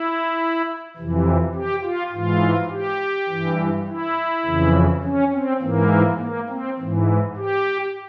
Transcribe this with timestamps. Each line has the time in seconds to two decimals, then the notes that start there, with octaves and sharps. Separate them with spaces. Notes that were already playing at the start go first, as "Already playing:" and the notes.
Already playing: E4
0.97 F2 C3 E3
1.55 G4
1.83 F4
2.12 G#2 E3 F4
2.71 G4
3.29 G2 E3
3.88 E4
4.46 F2 C#3 E3
5.04 C#4
5.33 C4
5.62 G#2 E3 A#3
6.20 A#3
6.50 C4
6.79 G#2 E3
7.37 G4